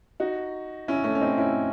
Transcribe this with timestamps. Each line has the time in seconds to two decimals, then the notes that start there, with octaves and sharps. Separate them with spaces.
0.20 D#4 F#4
0.88 C#4 E4
1.04 A3 C#4
1.15 C#4
1.21 C4 D#4
1.38 C#4 E4